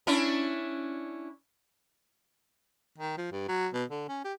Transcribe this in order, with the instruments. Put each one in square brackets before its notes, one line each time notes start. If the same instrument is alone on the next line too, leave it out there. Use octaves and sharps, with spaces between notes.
[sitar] C#4 D4 E4
[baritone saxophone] D#3
F3
G2
F#3
B2
D3
C#4
G4